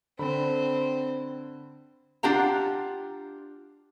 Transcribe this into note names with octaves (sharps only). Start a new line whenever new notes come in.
D3 C4 B5
D4 F4 G4 F#5 A#5